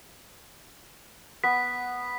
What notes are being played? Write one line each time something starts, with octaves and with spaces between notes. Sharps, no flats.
B3 B6